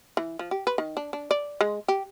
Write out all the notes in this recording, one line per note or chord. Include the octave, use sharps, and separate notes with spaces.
E3
F3
G4
B4
D#3
D4
D4
D5
G#3
G4